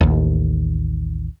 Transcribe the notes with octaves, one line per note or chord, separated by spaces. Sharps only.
A1 D#2